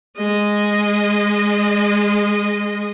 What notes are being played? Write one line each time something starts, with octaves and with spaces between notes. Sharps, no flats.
G#3 D#5